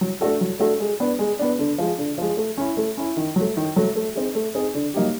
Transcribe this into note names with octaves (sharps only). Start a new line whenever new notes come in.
F#3
A3 D4 F#4 A4
F#3
A3 D4 F#4 A4
G#3
B3 D4
G#3
B3 D4
D3
F3 G#3
D3
F3 G#3
A3
C#4 E4
A3
C#4 E4
D#3
F#3 A3
D#3
F#3 A3
A3
C4 D#4 G#4
A3
C4 D#4 G#4
D3
F#3 A#3 D#4 G4